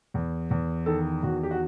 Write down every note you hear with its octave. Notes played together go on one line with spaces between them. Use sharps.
E2
E2
D#3 A4
E2 F#4
G4
F#4